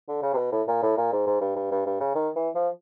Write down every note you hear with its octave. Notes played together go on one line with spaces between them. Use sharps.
D3
C#3
C3
B2
A2
A#2
A2
A#2
G#2
G#2
G2
G2
G2
G2
C#3
D#3
E3
F3